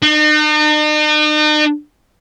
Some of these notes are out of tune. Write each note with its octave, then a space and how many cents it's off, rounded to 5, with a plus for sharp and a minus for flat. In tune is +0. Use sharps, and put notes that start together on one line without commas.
D#4 -45